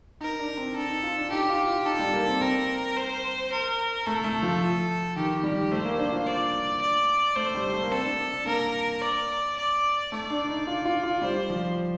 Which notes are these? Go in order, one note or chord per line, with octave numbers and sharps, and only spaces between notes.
D#4 A#4
D4
C4
D4 A4
D#4
F4
D4
D#4 G4
F4
F4
D#4 A4
G3
A#3
C4
C4 A#4
C5
A#4
A3 A4
A3
F3
D#3 G4
G3
A3 C5
A#3
D4
F4
D5
D5
A3 C5
G3
A3
A#3
C4 A4
D4
D4
D4
A#3 A#4
D5
D5
A3 D5
D4
D#4
F4
F4
F4
G3 C5
F3